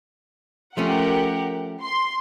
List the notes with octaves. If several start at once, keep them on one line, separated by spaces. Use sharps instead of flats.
F3 A3 C#4 G4 A#4 F#5
C6